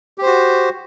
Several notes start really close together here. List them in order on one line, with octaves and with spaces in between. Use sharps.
G4 C5 F#4